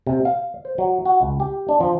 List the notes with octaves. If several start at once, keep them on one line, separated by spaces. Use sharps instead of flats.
C3
F5
C5
F#3
F#4
C#2
G4
D4
F3